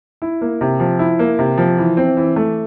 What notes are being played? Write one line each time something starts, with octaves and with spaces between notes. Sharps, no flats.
E4
A#3
C3
F3
E4
A#3
C3
F3
E3
C4
E3
A3